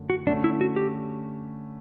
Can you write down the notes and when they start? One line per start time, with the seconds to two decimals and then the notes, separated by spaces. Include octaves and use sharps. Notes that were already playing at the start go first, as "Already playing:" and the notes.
Already playing: F#2 D3 A3
0.10 F#4
0.26 D3 A3 C#4 D4
0.44 E4
0.61 F#4
0.76 G4